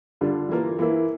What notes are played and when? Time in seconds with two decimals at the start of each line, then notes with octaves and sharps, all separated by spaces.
0.21 D3 G3 D4 F4
0.49 E3 A#3 F4 A#4
0.79 E3 A#3 E4